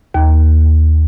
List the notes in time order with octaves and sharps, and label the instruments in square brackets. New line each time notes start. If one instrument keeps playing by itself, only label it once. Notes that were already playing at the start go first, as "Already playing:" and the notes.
[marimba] D#2